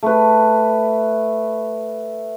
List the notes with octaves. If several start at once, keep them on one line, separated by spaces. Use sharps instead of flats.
A3 B4